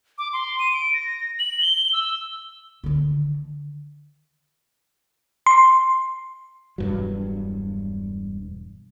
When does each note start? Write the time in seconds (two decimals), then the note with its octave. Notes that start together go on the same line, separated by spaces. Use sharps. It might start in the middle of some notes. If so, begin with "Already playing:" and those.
0.18 D6
0.33 C6
0.59 D#7
0.73 D7
0.94 A#6
1.39 F#7
1.62 G7
1.93 E6
2.84 D3 D#3
5.46 C6
6.78 E1 G2 F#3